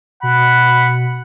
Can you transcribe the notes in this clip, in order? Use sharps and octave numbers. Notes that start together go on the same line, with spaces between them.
B2 F#5 B5